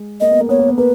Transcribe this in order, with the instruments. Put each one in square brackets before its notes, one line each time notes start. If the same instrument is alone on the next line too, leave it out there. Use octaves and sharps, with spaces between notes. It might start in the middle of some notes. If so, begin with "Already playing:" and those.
Already playing: [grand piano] G#3
[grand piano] A#3 [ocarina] D#5
[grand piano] B3
A#3
[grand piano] B3 [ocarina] C#5
[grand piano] A#3
B3
[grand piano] A#3 [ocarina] B4